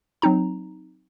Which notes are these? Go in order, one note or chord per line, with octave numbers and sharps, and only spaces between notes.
F#3 C4 D#4 A#5